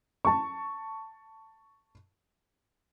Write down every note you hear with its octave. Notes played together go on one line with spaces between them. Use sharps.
A5 C#6